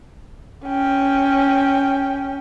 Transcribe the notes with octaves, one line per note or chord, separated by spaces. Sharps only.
C#4 G5